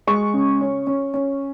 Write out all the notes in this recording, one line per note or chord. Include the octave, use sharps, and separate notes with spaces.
G#3 C#6
C#3
C#4
C#4
C#4